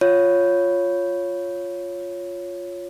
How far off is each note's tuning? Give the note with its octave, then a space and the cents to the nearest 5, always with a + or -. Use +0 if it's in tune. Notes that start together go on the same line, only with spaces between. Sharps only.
F4 +5 C#5 +0